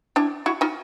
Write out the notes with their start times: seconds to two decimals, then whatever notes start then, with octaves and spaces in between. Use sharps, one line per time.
0.16 D4 E4
0.46 E4 F#4
0.61 D#4 F4